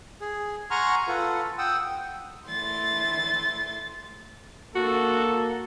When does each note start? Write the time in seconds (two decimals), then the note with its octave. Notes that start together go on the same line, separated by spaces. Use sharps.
0.21 G#4
0.71 F#5 G#5 A#5 C6 C#6 F6
1.08 F4 A4 B4 F#5
1.58 F#5 G5 D#6 E6
2.49 E3 A3 C6 A6
4.75 A#3 F#4 A4